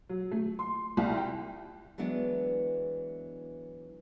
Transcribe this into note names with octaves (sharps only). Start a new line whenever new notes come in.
F#3
A3
C6
C2
G5
E3 F#3 G#3 B3 D4